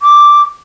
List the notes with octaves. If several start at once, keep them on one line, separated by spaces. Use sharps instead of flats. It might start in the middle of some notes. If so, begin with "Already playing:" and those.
D6